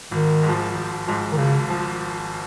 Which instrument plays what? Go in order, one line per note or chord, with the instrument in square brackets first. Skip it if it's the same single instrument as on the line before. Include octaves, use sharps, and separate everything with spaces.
[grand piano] G#1 [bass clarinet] D#3
[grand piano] G#2
F3
G#1
G#2 F3
[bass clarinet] D#3
[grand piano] G#1 [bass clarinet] C#3
[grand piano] F3